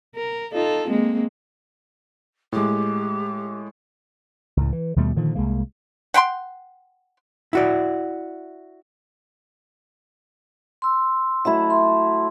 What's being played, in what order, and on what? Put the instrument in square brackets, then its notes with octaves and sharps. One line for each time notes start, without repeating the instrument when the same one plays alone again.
[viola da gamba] A#4
D#4 F4 A4
G#3 A#3 C4
[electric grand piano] A2 G#3 [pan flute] G4
[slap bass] C#2 A2
E3
D#2 B2 G3 A3
A#2 D3 D#3 F3
C2 G#3 A#3
[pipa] F#5 G5 B5 C6
[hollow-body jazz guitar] E4 F#4 D5
[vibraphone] C6 E6
[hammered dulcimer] F#3 A3 E4 [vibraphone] E5
[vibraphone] C6